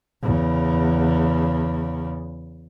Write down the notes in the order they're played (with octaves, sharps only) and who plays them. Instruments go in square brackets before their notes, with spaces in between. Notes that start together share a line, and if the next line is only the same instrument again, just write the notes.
[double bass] E2 C#3